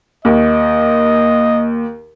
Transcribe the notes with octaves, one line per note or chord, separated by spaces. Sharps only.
D#2 D#5